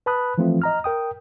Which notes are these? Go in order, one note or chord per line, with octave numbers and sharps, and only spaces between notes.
B4 A5 B5 D#6 F#6
E3 F3 A3 C4 F4
D#5 A#5 F6
A#4 G5 D#6